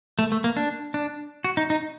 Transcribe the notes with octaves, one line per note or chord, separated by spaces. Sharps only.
A3
A3
A#3
D4
D4
F#4
D#4
D#4